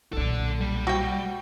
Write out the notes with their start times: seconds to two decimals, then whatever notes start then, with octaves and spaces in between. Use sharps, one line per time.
0.13 B1 A#2 A4 D5
0.61 G3
0.87 F#4 G5